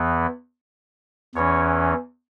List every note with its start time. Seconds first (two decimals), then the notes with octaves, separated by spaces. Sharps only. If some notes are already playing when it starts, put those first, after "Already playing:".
Already playing: E2 E3 B3
1.35 E2 E3 C#4 C#5